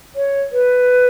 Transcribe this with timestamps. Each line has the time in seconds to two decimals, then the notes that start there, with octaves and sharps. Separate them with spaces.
0.16 C#5
0.52 B4